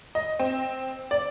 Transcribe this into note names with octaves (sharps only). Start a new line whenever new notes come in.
D#5
C4
D5